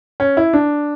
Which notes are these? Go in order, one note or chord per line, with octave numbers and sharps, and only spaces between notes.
C#4
E4
D4